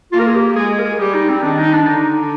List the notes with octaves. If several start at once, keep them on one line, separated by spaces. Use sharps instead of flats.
A#3 F4
A#4
G#4
G4
G#3 G#4
G#4
A#4
G#4
G3 G4
D#4
C4
D#3 D4
D#4
D4
D3 D#4